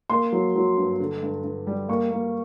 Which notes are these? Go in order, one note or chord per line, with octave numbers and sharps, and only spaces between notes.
A#3 C6
F#3
F#3
G2
D3
G2
G2
G3
A#3 C#6
A#3